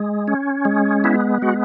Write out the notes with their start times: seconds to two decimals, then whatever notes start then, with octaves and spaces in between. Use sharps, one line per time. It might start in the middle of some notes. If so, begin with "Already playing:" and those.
Already playing: G#3
0.28 C#4
0.65 G#3
1.04 B3 E4
1.42 G#3 F#4